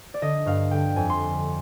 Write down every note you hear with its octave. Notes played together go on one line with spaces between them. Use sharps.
D5
D3 D#5
G2 F5
D3 G5
F2 G#5
C6